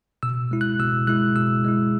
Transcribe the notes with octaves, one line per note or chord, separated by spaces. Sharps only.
B2 E6
G#3 E4
F#6
B2 E6
G#3 E4 F#6
B2 E6
G#3 E4